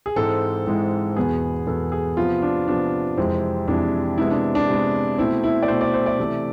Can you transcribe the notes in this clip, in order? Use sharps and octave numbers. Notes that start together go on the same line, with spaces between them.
G#4
G#2 E3 G#3 C4 A4
G#2 E3 G#3 C4
E2 B2 B3 G#4
E2 B2 B3 A4
G#4
C3 F3 B3 F4
D4
C3 F3 B3 D4
F2 C3 E3 G#3 C4
F2 C3 E3 G#3 C4 D4
C3 G#3 B3 E4
D4
D4
C3 G#3 B3
B2 A3 C4 E4
E4
D5
B2 A3 C4 C5
D5
C5
D5
C3 E3 A3